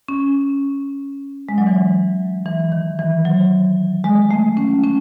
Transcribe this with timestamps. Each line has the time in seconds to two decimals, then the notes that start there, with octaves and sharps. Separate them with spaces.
0.09 C#4
1.49 G#3
1.58 F#3
1.67 E3
2.46 E3
2.72 D#3
2.99 E3
3.25 F#3
4.04 G#3
4.31 A3
4.57 C#4
4.84 C#4